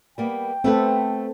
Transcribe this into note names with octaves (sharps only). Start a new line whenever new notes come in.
G3 A#3 B3 G5
A3 B3 C4 A4 B4